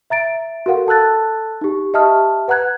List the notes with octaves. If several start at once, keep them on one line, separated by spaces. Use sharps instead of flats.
E5 A#5 A6 D7
F#4 A4 A#4 F5 F#5
A4 A5 E6 F#6 A6
D#4 G4
G4 D#5 E5 A5 D#6 F6
B4 F#5 A#5 F#6 G#6